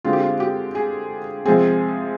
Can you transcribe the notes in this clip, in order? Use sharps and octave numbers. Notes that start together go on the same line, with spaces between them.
D3 G#3 C4 F4
G4
F4
G4
G#4
C3 F3 G#3 C4 G#4